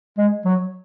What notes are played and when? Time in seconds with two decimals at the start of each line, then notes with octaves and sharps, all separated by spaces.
0.18 G#3
0.45 F#3